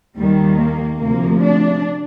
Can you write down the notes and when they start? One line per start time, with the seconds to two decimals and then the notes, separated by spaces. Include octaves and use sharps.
0.18 D#2 D#3 G3
0.59 A#3
1.00 D2 C3 F3 A#3
1.41 D4